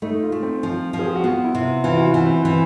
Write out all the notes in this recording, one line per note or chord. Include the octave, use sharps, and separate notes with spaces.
A3 D#4
F4
A3
C4
F3 F4
F3
G#4
G4
F#4
B3 F4
E4
C3
E3 F4
F#4
F4
E3
C4
E3